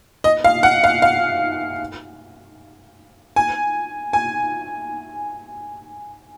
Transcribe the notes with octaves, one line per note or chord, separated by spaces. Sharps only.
D#5
F5
F#5
F5
F5
G#5
G#5